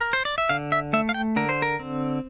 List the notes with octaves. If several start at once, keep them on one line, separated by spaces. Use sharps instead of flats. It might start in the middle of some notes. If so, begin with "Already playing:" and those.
A#4
C5
D5
E5
D3 F5
E5
A3 E5
F5
G5
D3 A#4
C5
A#4
C4